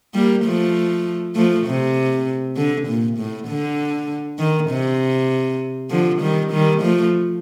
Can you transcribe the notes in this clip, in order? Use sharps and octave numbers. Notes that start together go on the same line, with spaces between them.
G3 A#3
F3 A3
F3 A3
C3
D3
A#2
A2
D3
D#3
C3
D3 F3
D#3 G3
D#3 G3
F3 A3